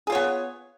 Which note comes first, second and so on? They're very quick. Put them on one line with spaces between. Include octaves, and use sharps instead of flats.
G#4 F4 C#5 B3